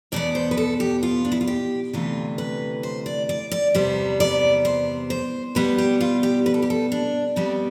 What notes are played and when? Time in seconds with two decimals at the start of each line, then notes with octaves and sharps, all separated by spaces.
0.12 E2 B2 B3 D5
0.35 C5
0.51 B4
0.57 A4
0.80 G4
1.03 F4
1.25 D4
1.32 E4
1.41 F4
1.47 G4
1.93 D2 C3 E3 A3 F4
2.38 B4
2.83 C5
3.06 D5
3.29 D5
3.52 D5
3.75 E2 C3 G3 B3 C5
4.20 D5
4.65 C5
5.10 C5
5.55 B2 G3 B3 B4
5.78 G4
6.01 F4
6.23 G4
6.46 B4
6.54 A4
6.62 G4
6.70 A4
6.92 D4
7.36 B2 G3 B3 C4